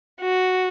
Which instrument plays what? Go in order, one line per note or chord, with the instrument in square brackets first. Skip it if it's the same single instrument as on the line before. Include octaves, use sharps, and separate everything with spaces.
[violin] F#4